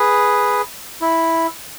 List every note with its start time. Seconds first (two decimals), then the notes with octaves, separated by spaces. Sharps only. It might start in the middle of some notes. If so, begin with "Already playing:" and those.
Already playing: G#4 B4
1.01 E4